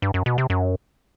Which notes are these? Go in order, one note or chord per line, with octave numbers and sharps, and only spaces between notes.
G2
F#2
B2
C3
F#2